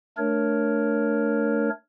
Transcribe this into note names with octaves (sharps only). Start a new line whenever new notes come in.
A3 D4 A#4 C#5